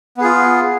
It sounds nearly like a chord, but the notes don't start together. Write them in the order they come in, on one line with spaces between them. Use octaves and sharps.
B3 G#4 F4